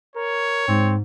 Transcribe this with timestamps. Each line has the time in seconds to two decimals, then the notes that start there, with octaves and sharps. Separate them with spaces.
0.16 A#4 C#5
0.68 G#2 C4